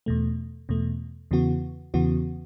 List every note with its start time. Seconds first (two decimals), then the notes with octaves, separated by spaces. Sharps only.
0.06 E2 B2 A3
0.69 E2 B2 A3
1.31 E2 C#3 E3 B3 F#4
1.94 E2 C#3 E3 B3 F#4